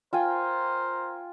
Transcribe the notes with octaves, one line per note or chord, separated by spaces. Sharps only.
F4 A#4 C5 G5 G#5